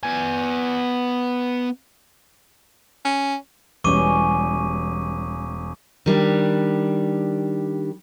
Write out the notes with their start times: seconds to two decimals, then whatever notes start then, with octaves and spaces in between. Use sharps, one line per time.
0.03 B3 G#5
3.05 C#4
3.84 E1 E3 G3 C#4 C#6 D6 D#7
6.06 D#3 G3 D4